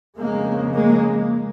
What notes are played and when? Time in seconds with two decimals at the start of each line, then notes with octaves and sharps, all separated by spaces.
0.18 F2 C#3 G#3 A#3
0.75 G#3 A#3